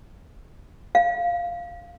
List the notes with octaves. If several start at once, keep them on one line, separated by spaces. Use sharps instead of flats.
F5